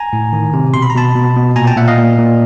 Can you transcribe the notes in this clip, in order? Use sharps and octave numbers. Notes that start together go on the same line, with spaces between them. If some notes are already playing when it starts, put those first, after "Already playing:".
Already playing: G#5 A#5
A2
D#3
C3
B2 C6
B5
A#5
B2 A5 B5
B2
B2
A#2 G#5 A#5
G5 A5
A#2 E5 F#5
D#5 F5
A#2
A#2